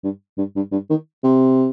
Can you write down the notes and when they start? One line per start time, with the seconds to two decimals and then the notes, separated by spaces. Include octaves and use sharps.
0.04 G2
0.38 G2
0.55 G2
0.71 G2
0.90 D#3
1.23 C3